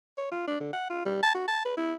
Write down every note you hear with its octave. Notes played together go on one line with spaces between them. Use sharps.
C#5
F4
D4
D3
F#5
F4
G3
A5
F#4
A5
B4
E4